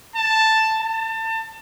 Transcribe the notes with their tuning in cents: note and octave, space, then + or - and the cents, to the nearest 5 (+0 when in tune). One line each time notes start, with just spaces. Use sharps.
A5 +5
A5 +30